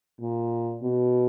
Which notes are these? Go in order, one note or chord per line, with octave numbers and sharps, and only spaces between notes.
A#2
B2